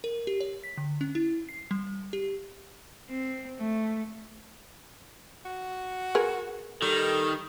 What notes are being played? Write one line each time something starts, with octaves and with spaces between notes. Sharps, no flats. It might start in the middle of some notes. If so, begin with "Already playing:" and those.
A#4
G4
C#5
B6
D3
C#4
E4
C7
G3
G4
C4
A3
F#4
G#4 A#4 B4
D#3 G3 A4